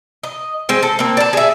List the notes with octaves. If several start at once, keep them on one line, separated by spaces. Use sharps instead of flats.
D#5
G#3 C4 C5
A4
A#3 C4
D5 A5
G#4 E5